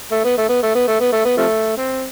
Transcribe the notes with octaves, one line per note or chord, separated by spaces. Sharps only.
A3
B3
A3
B3
A3
B3
A3
B3
A3
B3
C3 F3 A3
C4